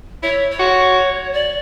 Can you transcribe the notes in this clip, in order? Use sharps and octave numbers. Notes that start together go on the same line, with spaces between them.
E4 C#5
C#5
F#4
D5